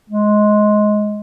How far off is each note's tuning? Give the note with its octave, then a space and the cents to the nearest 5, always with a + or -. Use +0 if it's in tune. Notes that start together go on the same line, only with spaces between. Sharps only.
G#3 +15